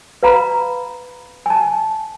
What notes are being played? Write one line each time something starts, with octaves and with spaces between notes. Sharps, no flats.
B4 F5 A#5 B5
G#5 A5